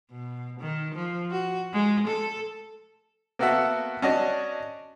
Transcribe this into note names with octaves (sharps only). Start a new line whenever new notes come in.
B2
D#3
F3
F#4
G#3
A4
A#3 B3 F#4 A4 E5 F#5
C#4 D4 F#4 C#5 D#5